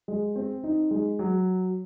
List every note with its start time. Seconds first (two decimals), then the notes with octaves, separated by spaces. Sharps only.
0.08 G#3
0.36 C4
0.63 D#4
0.91 G#3
1.19 F#3